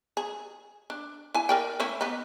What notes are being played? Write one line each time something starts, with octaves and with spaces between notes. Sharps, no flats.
G#4
D4
E4 G#5
A#4 D5 G5
A3 C#4 E4
B3 D#4